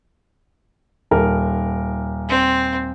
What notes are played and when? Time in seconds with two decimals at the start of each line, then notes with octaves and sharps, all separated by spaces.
1.11 D#1 A#4
2.29 C4